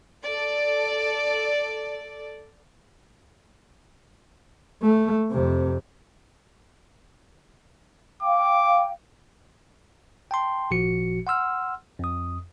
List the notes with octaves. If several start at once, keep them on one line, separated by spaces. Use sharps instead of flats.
A4 D5
A3
F2 C3
F5 G5 D6
G5 A5 C6
G#1 A#2 F3 F#4 C#7
F#5 C6 E6 F6
F2 D#6